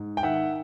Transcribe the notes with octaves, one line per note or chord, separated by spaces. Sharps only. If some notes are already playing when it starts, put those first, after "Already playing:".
Already playing: G#2
G5
D#3 E5 F#5